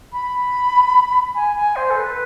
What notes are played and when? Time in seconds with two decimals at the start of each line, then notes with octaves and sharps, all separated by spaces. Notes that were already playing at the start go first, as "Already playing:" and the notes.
0.13 B5
1.35 G#5
1.56 G#5
1.76 C5
1.90 A4
1.97 B4